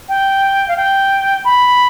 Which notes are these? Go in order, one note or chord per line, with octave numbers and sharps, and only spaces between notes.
G5
F5
G5
B5